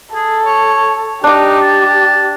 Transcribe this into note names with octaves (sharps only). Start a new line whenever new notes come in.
G#4 A4
C#5
D4 D#4 G4 D6
A5